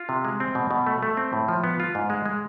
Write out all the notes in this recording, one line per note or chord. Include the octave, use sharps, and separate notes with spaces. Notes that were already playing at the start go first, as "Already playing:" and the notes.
Already playing: F4
C3
G#3
C4
B2
B2
A3
A3
C4
A2
F3
B3
F4
G#2
G#3
G#3